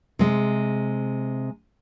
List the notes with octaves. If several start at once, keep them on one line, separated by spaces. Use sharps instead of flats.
C3 G#3